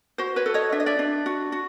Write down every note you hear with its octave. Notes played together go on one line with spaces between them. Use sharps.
F#4 C5
B4 C#5
A4
C#5 D#5
D4 E5
D#5
D5 E5
D4
F#4
F#4